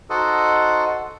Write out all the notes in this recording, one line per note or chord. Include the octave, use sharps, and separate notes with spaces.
D#4 F#4 A4 C5 D#5 F#5